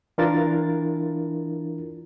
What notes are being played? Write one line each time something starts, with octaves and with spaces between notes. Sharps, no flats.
E3 D4 E4 F4 A#4 A6